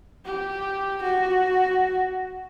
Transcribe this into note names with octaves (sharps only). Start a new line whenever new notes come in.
G4
F#4